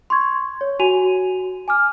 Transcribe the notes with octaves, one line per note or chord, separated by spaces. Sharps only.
C6 C#6 G#6
C#5
F#4 G#5 D#7 F7
G#5 D6 F6